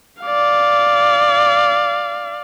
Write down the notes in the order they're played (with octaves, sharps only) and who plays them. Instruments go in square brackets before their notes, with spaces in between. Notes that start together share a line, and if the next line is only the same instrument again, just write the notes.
[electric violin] D5 F5